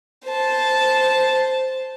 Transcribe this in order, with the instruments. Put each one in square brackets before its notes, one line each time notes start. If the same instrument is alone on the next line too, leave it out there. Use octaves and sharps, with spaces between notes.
[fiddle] C5 A5